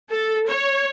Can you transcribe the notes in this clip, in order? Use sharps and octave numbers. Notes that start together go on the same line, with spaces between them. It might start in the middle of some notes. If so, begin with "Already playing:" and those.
A4
C#5